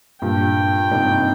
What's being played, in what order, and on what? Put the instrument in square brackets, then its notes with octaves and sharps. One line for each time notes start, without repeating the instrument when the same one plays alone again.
[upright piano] G2 A#2 [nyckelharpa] G5
[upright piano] G#2 C3